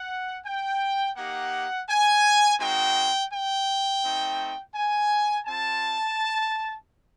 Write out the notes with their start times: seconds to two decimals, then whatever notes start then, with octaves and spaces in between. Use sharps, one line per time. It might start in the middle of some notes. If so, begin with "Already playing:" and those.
Already playing: F#5
0.46 G5
1.17 A#3 D#4 G4 F#5
1.89 G#5
2.60 G#3 C4 D#4 F#4 G5
3.32 G5
4.04 A3 C4 D#4
4.75 G#5
5.47 C4 F4 A5